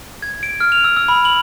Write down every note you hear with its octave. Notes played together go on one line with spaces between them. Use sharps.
G#6
D7
F6
F7
E6
E6
B5
F#7